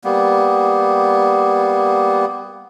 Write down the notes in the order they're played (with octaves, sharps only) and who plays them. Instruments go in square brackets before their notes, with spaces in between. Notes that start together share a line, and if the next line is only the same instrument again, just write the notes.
[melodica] G3 A#3 B3